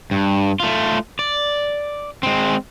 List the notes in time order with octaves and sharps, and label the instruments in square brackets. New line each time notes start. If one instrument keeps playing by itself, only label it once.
[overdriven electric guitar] G2
A3 F4
D5
G#3 C4